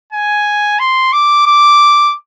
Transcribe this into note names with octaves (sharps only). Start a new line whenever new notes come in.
G#5
C6
D6
D6